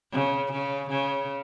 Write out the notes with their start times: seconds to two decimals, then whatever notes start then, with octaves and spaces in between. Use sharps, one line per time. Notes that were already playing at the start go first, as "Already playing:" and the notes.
0.13 C#3
0.52 C#3
0.90 C#3